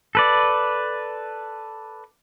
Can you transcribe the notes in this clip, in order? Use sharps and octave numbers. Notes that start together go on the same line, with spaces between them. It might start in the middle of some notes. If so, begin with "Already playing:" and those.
A4 B4 D5